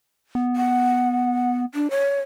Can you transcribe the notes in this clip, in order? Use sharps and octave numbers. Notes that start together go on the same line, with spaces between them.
B3
F#5
D4
C#5